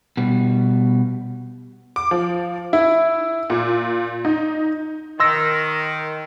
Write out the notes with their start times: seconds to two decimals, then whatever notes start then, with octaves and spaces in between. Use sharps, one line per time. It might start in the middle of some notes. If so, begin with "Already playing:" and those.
0.17 B2 G3
1.96 D6
2.11 F3
2.73 E4
3.50 A#2
4.25 D#4
5.20 D#3 C6 E6 A#6